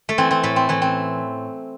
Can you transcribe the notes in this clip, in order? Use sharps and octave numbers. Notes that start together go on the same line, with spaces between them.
A3
E3 C4
C4
A2 A3
C4
E3 A3
C4